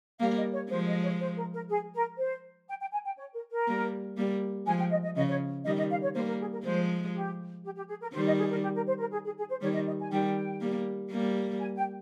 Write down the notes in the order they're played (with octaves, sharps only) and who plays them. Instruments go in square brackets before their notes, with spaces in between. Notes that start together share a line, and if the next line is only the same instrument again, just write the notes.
[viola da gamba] G3 A#3 [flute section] F5
[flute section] D#5
C#5
[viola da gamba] F3 G#3 [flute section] C5
[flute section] D#5
C#5
C5
A#4
A#4
G#4
A#4
C5
G5
G5
G#5
G5
C#5
A#4
A#4
[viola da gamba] G3 A#3
G3 A#3
[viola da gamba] F3 G#3 [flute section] G#5
[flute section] G5
D#5
D#5
[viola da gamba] C#3 F3 [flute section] D#5
[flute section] C#5
[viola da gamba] D#3 G3 [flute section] D#5
[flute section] D#5
F5
C#5
[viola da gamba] G3 A#3 [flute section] C5
[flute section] A#4
G#4
A#4
[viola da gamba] F3 G#3 [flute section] C5
[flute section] G4
G4
G4
G#4
A#4
[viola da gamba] D#3 G3 [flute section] C5
[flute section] D#5
G#4
A#4
G4
A#4
C5
A#4
G#4
G#4
G#4
C5
[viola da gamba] D#3 G3 [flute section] C#5
[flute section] D#5
D#5
G#5
[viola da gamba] D#3 G3 [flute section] G5
[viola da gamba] G3 A#3
G3 A#3
[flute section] G#5
G5